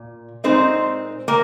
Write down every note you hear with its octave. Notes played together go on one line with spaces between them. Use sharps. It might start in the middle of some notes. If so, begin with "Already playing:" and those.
Already playing: A#2
A#2 G#3 C4 D#4 C5
A#3